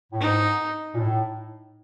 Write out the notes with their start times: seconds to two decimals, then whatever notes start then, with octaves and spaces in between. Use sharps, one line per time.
0.12 A2
0.20 G#2 D#4
0.93 A#2
0.97 A2